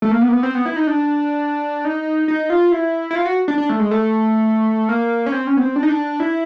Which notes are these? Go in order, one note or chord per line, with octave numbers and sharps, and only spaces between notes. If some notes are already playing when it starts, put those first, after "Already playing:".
A3
A#3
B3
A#3
B3
C4
B3
E4
D#4
D4
D#4
D#4
F4
E4
E4
F4
F#4
D4
D4
A3
G#3
A3
A#3
C#4
C4
C#4
B3
C4
D4
D#4
D4
E4